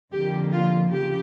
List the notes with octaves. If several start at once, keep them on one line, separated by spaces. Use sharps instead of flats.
F2 D3 F3 A#3 G4
F4
C#3 F3 G4